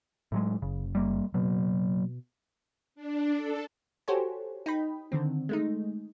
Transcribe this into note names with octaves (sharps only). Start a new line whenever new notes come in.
A2 F#3 G#3
F#1 C#3
G3 A#3
B2 F#3 A#3
D4
A4
F#4 G4 A4 C5 C#5 G#5
D#4 G5 B5
D3 D#3 C4
G#3 A3 D#4